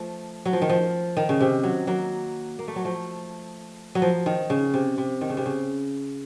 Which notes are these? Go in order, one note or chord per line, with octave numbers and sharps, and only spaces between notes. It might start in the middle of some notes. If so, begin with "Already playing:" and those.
Already playing: F3 A3
F#3
F3
D#3
F3
D#3
C#3
C3
F#3
F#3 A#3
A#3
A3
F#3
F3 A3
F#3
F3
D#3
C#3
C3
C3
D#3
C#3
C3
C#3